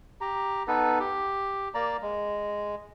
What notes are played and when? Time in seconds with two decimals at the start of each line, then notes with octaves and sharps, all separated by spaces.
0.21 G4 A#5
0.68 B3 D#4 A4 B4
1.00 G4
1.74 A#3 D5 A#5
2.02 G#3